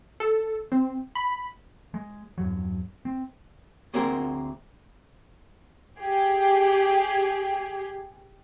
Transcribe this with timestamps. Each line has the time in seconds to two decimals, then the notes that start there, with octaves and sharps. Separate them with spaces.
0.20 A4
0.72 C4
1.15 B5
1.94 G#3
2.38 E2 G2 F#3
3.05 C4
3.94 D2 A#3 C4 G#4 A#4
5.99 G4 G#4